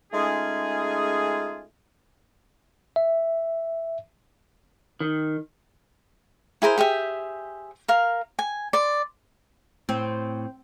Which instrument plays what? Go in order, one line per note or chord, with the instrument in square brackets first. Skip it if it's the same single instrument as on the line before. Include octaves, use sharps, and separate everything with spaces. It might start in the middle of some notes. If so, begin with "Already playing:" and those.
[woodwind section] G#3 A3 C#4 D#4 F4 G#4
[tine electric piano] E5
[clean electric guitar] D#3
[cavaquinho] E4 G#4 A#4 C5
G4 G#4 C5 E5
A#4 F5
G#5
D5 C6
[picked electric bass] A2 [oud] C4